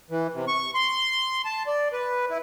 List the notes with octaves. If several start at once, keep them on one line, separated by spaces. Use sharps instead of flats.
E3
C3
C#6
C6
A5
D5
B4
E4